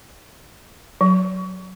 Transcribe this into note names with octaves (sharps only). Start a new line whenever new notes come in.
F#3